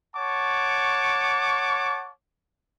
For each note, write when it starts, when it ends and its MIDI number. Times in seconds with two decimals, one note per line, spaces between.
0.16 2.10 73
0.16 2.10 78
0.16 2.10 81
0.16 2.10 85
0.16 2.10 86